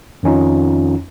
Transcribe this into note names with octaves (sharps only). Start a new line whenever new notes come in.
F2 D#3 C#4 D#4 F4